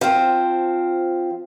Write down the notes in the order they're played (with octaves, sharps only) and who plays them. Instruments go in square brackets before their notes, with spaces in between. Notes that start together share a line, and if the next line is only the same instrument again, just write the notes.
[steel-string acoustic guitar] F3 C4